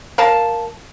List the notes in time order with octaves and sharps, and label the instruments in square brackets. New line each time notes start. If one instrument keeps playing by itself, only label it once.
[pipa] A#4 F5 A5